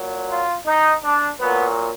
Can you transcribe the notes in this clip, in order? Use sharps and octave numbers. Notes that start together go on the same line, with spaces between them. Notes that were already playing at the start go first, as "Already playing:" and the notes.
Already playing: A#2 F#3
F4
D#4
D4
A#2 F#3 B3